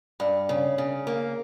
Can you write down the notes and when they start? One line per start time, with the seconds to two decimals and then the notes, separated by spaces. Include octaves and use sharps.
0.20 G2
0.49 C#3
0.78 C#3
1.07 A#3